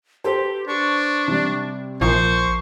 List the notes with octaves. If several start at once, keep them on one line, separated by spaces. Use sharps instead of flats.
G4 A4 B4 C5
D4 C#6
C3 G3
A#1 F3 A#4 C5 C#6